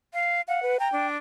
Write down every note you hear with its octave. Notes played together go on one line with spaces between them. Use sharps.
F5
F5 F#5
B4
G5 A#5
D4